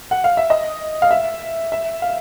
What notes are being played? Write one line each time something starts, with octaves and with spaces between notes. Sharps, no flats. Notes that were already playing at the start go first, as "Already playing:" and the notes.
F#5
F5
E5
D#5
F5
E5
E5
F5